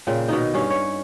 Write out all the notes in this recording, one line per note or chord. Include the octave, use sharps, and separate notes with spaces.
A#2 C#3 G5
B2 D#3 D#4
G2 C#4 F5
C#5